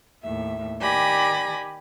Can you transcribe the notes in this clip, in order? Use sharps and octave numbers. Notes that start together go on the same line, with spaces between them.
D#2 A2 E5
D#3 G4 D5 G#5 B5 A#6